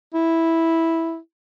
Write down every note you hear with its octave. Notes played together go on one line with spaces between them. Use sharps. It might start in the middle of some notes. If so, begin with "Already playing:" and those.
E4